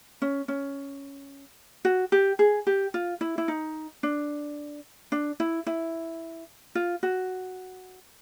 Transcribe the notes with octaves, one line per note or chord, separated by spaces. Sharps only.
C#4
C#4
F#4
G4
G#4
G4
F4
E4
E4
D#4
D4
D4
E4
E4
F4
F#4